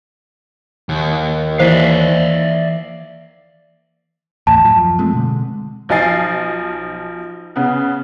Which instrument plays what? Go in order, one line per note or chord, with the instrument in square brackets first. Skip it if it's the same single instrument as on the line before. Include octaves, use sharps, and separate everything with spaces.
[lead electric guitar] D#2
[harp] E3 A#3 C7 [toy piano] C5 [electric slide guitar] D5 E5 F5
[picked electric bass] A1 D#2 A2 [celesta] A5
[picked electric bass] F#2 F3
G#3 A3 C4
B2 D3 G#3
[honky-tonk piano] B1 F3 D#4 G#5 A6 C7
C#3 B3